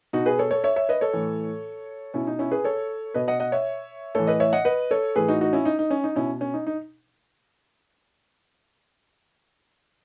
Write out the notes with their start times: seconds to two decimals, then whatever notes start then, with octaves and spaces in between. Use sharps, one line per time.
0.13 B2 D#4 F#4
0.26 G#4 B4
0.39 A4 C#5
0.51 A4 C#5
0.64 C#5 E5
0.76 C#5 E5
0.89 B4 D#5
1.01 A4 C#5
1.13 A2 E3
2.14 B2 C#4 E4
2.27 D#4
2.39 C#4 E4
2.52 G#4 B4
2.64 A4 C#5
3.14 B2 B4 D#5
3.28 D#5 F#5
3.40 D#5 F#5
3.52 C#5 E5
4.15 A2 E3 A4 C#5
4.27 B4 D#5
4.40 C#5 E5
4.53 D#5 F#5
4.65 B4 D#5
4.91 A4 C#5
5.16 A2 E3 G#4 B4
5.28 D#4 F#4
5.41 D#4 F#4
5.53 C#4 E4
5.65 D#4
5.79 D#4
5.91 C#4
6.04 D#4
6.16 B2 C#4 E4
6.41 C#4
6.54 D#4
6.67 D#4